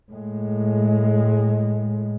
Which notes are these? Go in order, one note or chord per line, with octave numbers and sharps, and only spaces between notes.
A2 G#3